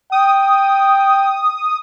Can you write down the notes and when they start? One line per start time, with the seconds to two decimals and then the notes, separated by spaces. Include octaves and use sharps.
0.12 G5 D#6